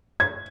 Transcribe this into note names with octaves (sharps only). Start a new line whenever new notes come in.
G#6